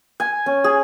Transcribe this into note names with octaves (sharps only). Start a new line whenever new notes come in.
G#5
C#4
G#4